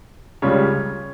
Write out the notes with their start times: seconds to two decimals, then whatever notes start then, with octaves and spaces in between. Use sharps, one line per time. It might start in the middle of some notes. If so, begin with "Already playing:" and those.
0.42 C#2 C#3 G3 C#4 F4 C#5